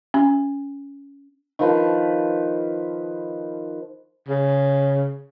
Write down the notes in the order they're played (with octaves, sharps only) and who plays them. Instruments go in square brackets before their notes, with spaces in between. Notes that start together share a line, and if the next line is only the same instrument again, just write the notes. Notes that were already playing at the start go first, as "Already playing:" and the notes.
[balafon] C#4
[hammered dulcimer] D#3 F3 B4 A5
[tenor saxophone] C#3